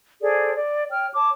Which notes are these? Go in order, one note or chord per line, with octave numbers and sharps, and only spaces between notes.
G#4 A4 C5 D5
D5
C#5 G5 F6
C#5 A5 D6